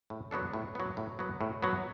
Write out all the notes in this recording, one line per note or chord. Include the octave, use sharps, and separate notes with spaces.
A2
F#3 B3 D4 A4
A2
F#3 B3
A2
F#3 B3
A2
F#3 B3